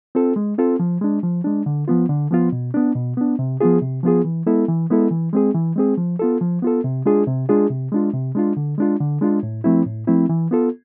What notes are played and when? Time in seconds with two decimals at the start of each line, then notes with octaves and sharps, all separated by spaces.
0.15 C4 F4 A4
0.36 G#3
0.58 C4 F4 A4
0.80 F3
1.01 G#3 D4
1.23 F3
1.44 G#3 D4
1.66 D3
1.88 F3 B3 F4
2.09 D3
2.31 F3 B3 F4
2.52 B2
2.74 B3 D4
2.95 B2
3.17 B3 D4
3.39 C3
3.61 F3 B3 F4 G#4
3.82 C3
4.03 F3 B3 F4 G#4
4.24 E3
4.46 G#3 B3 E4 A4
4.68 E3
4.90 G#3 B3 E4 A4
5.11 E3
5.33 G#3 C4 G#4
5.54 E3
5.76 G#3 C4 G#4
5.98 F3
6.19 B3 F4 A4
6.41 F3
6.62 B3 F4 A4
6.84 C3
7.05 G#3 D4 F4 G#4
7.27 C3
7.49 G#3 D4 F4 G#4
7.70 C3
7.92 G#3 D4 F4
8.13 C3
8.35 G#3 D4 F4
8.57 D3
8.78 G#3 D4 F4
9.00 D3
9.21 G#3 D4 F4
9.43 A2
9.64 F3 A3 C4 E4
9.86 A2
10.07 F3 A3 C4 E4
10.29 E3
10.51 B3 F4 A4